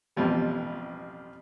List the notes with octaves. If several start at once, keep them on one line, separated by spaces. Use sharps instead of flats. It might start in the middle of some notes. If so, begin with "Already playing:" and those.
A1 F2 B2 F3 G3